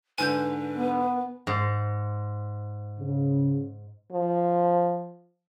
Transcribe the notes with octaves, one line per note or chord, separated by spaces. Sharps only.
G#2 D3 B4 G#5 G6
B3
G#2
C#3
F3